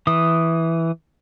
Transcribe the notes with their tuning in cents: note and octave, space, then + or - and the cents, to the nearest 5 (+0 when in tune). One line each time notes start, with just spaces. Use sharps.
E3 +0 D#6 -5